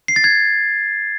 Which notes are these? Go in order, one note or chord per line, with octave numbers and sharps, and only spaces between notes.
C7
A6
G#6